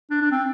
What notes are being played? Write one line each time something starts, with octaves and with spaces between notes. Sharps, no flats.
D4
D4
C4